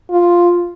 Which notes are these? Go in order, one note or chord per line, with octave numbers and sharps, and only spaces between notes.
F4